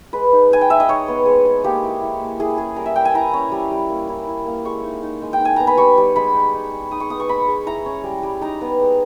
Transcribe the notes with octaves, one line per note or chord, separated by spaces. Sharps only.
G#3 B4
D#4
D#4 G#5
G5
G#3 E5
D#5
D#4 C#5
B3
G#3
G#3
A#3 G4
E4
E4
A#3
E4 G#4
C#4 G#4
G3 A#4
E5
G3 G5
G#5
E4 A#5
C#4
G3
G3
A#3
E4
E4
A#3
G#3 C#6
D#4
D#4
G#3
G5
D#4 G#5
B3 A#5
B5
G3 C#6
G3
G#3 B5
D#4
D#4
G#3
D#4 D#6
C#6
B3 D#6
C#6
G#3 B5
G#3
E4 A#5
C#4
G3
G3
D#4 A#5
B3
G#3